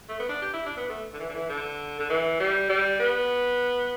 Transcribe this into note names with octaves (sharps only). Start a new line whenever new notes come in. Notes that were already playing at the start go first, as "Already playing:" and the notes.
A3
B3
D4
G4
E4
D4
B3
A3
D3
E3
D3
E3
D3
D3
E3
G3
G3
B3